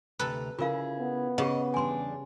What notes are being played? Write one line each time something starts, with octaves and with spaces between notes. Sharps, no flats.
D2 C3 A4 B4 A#5
C#3 E4 F4 G#4 A#4 F5
B3
C#3 G4 G#4 D#5 F#5
E2 G3 D4 G#5 C6